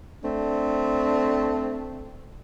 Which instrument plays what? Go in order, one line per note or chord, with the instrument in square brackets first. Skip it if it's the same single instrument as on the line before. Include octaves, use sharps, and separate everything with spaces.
[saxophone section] A3 C4 D4